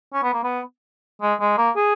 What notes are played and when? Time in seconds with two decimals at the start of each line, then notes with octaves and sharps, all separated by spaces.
0.14 C#4
0.23 B3
0.34 A#3
0.44 B3
1.22 G#3
1.41 G#3
1.58 A#3
1.77 G#4